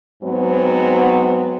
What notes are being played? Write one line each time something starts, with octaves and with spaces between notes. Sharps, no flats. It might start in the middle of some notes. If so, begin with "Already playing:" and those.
G#2 F#3 G#3 B3 C4